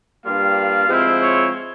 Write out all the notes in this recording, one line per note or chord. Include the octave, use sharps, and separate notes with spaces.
G2 G3 A#3 F4 F5
F3 G#3 C4 E4
C#5